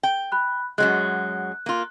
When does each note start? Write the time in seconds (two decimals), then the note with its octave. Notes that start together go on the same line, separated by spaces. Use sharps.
0.03 G5
0.32 B5 F#6
0.78 F#2 F#3 G#3 F#6
1.66 A#3 F4